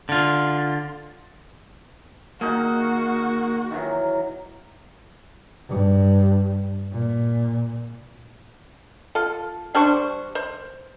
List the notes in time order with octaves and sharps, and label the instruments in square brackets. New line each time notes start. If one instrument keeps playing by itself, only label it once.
[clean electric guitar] D3 F4
[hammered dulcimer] D#3 D#4 G#4 [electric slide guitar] A#3 [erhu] F#4
[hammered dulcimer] D#3 E3 F#3
[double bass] G2
A#2
[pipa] F4 A4
G3 D4 C5 C#6
C5